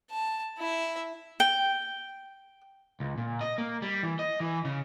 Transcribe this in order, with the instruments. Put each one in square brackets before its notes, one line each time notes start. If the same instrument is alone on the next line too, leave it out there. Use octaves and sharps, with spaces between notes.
[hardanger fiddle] A5
E4 E5
[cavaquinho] G5
[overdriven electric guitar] C#2
A#2
D#5
A#3
G3
E3
D#5
E3
C#3